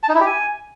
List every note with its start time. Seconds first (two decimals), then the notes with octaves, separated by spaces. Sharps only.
0.03 A5
0.09 D#4
0.15 E4
0.20 G4
0.26 G#5